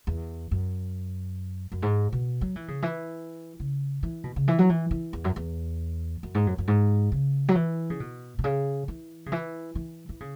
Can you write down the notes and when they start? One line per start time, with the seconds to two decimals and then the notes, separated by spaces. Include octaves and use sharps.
0.07 E2
0.51 F#2
1.72 F#2
1.82 G#2
2.12 B2
2.41 F#3
2.56 E3
2.68 C#3
2.82 E3
3.60 C#3
4.03 E3
4.24 B2
4.36 C#3
4.48 E3
4.59 F#3
4.69 E3
4.91 E3
5.13 E2
5.24 F#2
5.36 E2
6.23 F#2
6.35 G#2
6.47 F#2
6.58 F#2
6.68 G#2
7.12 C#3
7.48 F#3
7.55 E3
7.90 C#3
8.00 B2
8.39 B2
8.44 C#3
8.88 E3
9.26 C#3
9.32 E3
9.75 E3
10.09 E3
10.20 C#3